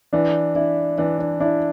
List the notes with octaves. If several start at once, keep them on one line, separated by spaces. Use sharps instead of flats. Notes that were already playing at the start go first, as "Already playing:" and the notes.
E3 D4
D4 E4
E3 D4
D4
D4 E4